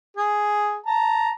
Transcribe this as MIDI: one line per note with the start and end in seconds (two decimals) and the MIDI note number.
0.17 0.77 68
0.86 1.30 81
0.86 1.30 82